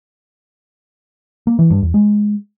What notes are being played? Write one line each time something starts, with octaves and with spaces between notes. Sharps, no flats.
A#3
E3
G2
E2
G#3